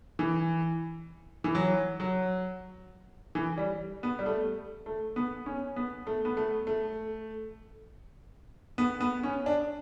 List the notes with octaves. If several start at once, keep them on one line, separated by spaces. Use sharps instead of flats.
E3
E3
F#3
F#3
E3
G3
B3
G3
A3
A3
B3
C#4
B3
A3
B3
A3
A3
B3
B3
C#4
D4